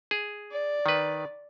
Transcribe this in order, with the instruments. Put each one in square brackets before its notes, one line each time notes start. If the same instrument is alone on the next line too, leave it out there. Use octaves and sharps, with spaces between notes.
[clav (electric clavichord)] G#4
[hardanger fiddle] D5
[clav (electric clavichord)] D#3 B4